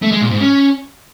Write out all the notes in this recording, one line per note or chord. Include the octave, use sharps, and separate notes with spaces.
A3
G#3
A#2
G#2
C#4